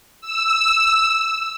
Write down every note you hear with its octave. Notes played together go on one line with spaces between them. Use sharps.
E6